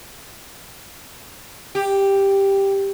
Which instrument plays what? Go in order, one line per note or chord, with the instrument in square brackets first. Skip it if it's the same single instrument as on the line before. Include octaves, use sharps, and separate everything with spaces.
[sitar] G4